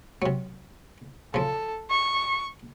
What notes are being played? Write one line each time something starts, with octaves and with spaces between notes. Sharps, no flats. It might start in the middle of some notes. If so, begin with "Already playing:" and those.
C3 F#3
C#3 F3 A4
C#6